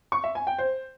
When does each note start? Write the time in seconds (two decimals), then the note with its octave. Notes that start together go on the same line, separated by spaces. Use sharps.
0.12 C#6
0.24 E5
0.35 G#5
0.47 G5
0.58 C5